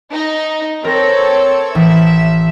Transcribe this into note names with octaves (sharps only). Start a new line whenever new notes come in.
D#4
C4 A4 A#4 C#5 A#6
A1 E5